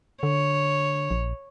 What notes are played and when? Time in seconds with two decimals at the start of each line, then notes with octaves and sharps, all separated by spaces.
0.23 D3 C#5
1.11 A#1